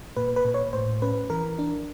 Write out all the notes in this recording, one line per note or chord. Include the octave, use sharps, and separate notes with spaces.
A#2 B4
B4
A#2
C#5
A2 C5
C#4 B4
E3 A#4
D4